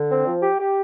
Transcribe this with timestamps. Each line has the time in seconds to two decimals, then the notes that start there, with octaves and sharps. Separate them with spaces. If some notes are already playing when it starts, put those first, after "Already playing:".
Already playing: D3
0.11 C4
0.27 F3
0.43 G4
0.60 G4